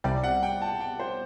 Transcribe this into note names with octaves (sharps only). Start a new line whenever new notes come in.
C2 C3 G3 D5
F#5
G5
A5
G5
C5